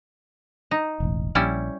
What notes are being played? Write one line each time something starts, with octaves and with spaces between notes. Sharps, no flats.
D#4
E1 A1
A#1 G3 C#4 E4